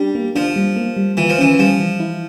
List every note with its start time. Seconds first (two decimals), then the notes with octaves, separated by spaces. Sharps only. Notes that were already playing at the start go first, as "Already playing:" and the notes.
Already playing: G3 D4
0.15 A#3
0.35 F3 D4
0.56 G3
0.76 A#3
0.97 G3
1.17 E3 F4
1.29 F3
1.38 E3 C#4
1.59 F3 G3
1.80 E3
2.00 E4